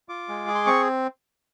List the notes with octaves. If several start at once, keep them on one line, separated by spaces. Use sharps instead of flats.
F4 D6
G#3
G#4
C6
C4 C#6